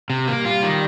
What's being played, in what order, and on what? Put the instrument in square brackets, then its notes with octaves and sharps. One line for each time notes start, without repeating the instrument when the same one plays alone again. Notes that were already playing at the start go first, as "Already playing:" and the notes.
[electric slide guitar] C3
[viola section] G3 [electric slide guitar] A#3
[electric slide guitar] F4
D#3